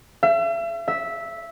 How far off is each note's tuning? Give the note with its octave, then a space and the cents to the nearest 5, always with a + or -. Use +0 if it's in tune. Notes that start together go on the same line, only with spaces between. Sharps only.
E5 +40
E5 -10